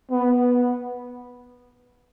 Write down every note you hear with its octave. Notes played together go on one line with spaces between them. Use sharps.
B3